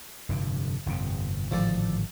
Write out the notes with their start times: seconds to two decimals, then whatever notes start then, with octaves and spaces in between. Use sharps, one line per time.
0.29 F1 G2 D3
0.86 G1 F2 C3
1.51 G#1 A2 D3 F3 A4 D5